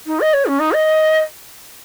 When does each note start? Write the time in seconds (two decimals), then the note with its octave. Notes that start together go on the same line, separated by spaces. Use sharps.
0.06 D#4
0.20 D#5
0.33 C#5
0.46 C#4
0.59 D#4
0.72 D#5